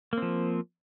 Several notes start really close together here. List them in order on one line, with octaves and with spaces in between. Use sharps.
A#3 C4 F3